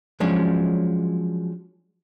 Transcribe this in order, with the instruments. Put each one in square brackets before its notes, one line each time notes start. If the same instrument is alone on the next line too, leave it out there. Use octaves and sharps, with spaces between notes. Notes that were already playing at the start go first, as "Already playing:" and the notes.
[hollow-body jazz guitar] F3 F#3 G#3 C#4 D4